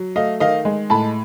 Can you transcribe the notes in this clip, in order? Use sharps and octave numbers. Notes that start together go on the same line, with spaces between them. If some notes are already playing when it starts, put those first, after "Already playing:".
Already playing: F#3
A3 D#5 F5
D#3 D#5 F5
G#3
A2 A5 B5